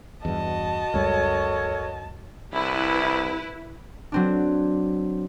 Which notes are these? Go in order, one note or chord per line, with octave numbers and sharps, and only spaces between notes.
E2 G2 F#4 D#5 A5
C#2 F#2 G3 A4 A#4 C#5
C2 E4 B4
F#3 C4 D4